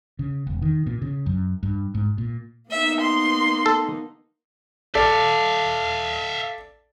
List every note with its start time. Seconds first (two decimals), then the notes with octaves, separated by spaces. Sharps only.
0.19 C#3
0.47 E1
0.62 D#3
0.86 A#2
1.02 C#3
1.26 F#2
1.63 G2
1.95 G#2
2.18 A#2
2.70 A#3 B3 D#4 E5
3.00 C6
3.66 A4
4.95 A4 D5 E5 F5